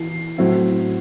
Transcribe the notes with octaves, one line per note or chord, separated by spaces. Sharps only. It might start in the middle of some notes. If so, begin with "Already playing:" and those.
Already playing: E3 C7
A2 F#3 C4 E4